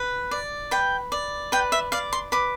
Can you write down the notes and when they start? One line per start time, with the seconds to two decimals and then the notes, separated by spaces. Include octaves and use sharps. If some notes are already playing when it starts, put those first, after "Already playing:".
Already playing: B4
0.31 D5
0.71 B4 G5
1.12 D5
1.52 B4 G5
1.72 E5
1.92 D5 F5
2.13 C6
2.32 B4 D6